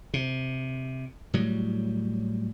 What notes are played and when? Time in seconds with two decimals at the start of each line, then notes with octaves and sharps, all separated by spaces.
0.14 C3
1.34 A2 F#3 G3